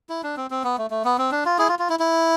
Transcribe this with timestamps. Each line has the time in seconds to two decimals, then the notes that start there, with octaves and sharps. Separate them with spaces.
0.09 E4
0.23 D4
0.37 C4
0.51 C4
0.64 B3
0.78 A3
0.90 A3
1.05 B3
1.18 C4
1.32 D4
1.45 F4
1.59 E4 G#4
1.69 F4
1.79 F4
1.89 E4
1.99 E4